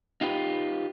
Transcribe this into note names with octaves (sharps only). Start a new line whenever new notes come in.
D#4 F4 G4 B4